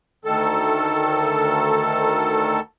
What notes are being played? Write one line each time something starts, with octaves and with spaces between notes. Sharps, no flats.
D2 D#3 A4